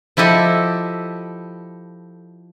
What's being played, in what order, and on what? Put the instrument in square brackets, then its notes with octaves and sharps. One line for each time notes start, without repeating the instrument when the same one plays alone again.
[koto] F3 E4 G4 A4 D#5